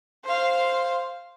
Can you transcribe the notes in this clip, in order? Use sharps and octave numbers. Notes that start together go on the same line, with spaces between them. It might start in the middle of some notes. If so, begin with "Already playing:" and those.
C5 F5